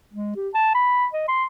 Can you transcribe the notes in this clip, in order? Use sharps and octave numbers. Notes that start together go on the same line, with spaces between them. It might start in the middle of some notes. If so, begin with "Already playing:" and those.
G#3
G4
A5
B5
D#5
C6